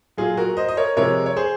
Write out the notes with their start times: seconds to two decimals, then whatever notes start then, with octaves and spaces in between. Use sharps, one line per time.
0.17 A#2 F#3 F4 G#4
0.37 F#4 A#4
0.57 C5 D#5
0.69 D#5
0.77 A#4 C#5
0.97 C3 F3 G#3 A#4 C#5
1.26 C#5
1.37 G#4 C5